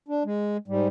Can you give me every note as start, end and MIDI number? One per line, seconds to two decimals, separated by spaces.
0.08 0.23 62
0.25 0.57 56
0.68 0.88 44
0.68 0.88 55